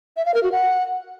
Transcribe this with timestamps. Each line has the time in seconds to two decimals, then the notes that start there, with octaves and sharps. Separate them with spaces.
0.17 E5
0.25 F5
0.34 A#4
0.43 F#4
0.52 F#5